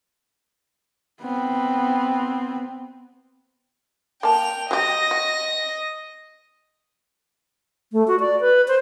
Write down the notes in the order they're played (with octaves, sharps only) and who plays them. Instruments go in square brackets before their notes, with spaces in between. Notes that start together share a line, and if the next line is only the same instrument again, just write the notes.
[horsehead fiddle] B3 C4
[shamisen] A#3 A5 [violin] G5 F7
[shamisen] F#3 G4 [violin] D#5 A#6
[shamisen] F#4
[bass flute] A3
F#4
D5
B4
C5